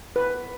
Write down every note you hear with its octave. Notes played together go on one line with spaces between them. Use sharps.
B4